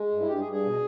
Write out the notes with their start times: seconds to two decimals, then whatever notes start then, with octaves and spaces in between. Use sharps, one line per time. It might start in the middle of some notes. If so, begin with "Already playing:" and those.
Already playing: G#3
0.11 G2
0.21 E4
0.28 G2 G4
0.40 G#4
0.45 G2
0.52 G#4
0.64 B2